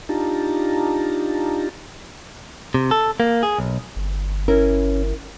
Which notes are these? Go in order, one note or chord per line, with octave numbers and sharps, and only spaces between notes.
D4 D#4 F4 G4 A5 A#5
C3
A4
A#3
G#4
B1
G1
C#4 E4 A#4